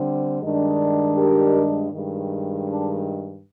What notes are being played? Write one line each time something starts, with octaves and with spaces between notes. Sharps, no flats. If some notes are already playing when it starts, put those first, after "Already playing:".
Already playing: D3 G3 C4
G2 D#3 G#3 D4
G4 A#4
G2 D#3 G#3
D4